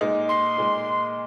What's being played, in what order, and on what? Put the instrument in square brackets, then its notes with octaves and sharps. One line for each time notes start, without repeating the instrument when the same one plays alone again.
[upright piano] A#2 G#3 D#4
[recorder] C6
[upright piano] A#2 G#3 D#4